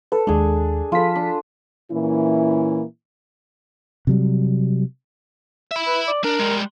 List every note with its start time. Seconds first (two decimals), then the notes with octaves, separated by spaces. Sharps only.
0.12 A4 B4
0.27 D#2 G#3 D4 G#4
0.92 F3 F4 A4 B5 B6
1.16 D4
1.92 A#2 E3 A#3 C#4 E4
4.07 C3 F#3 G3
5.71 E5 B5
5.87 B4
6.08 D5
6.24 D4 A#4
6.39 G3 G#3